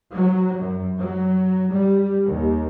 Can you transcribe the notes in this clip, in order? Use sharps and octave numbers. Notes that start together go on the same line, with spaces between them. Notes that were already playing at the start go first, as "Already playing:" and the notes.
F#3
F#2
F#3
G3
D#2